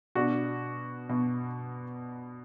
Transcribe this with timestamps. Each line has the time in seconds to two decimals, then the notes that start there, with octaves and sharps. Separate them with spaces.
0.15 B2 D4 F#4
1.09 B2